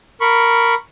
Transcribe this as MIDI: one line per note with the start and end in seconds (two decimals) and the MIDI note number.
0.21 0.74 70
0.21 0.74 83
0.21 0.74 85